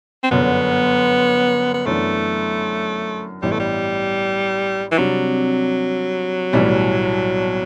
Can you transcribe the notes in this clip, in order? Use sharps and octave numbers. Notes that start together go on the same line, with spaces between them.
C4
G1 F#2 D3 B3
B3
F#2 E3 A3 B3 D4
A1 G2 E3 G3 B3
A3
G3
E3
C3 F#3 G3 D4
B1 A2 E3 G3